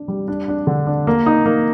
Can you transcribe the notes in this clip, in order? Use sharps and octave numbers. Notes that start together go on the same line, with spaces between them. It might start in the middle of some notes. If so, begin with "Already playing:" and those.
Already playing: D4
G3
D4
D4
D3
D4
A#3
D#4
A#3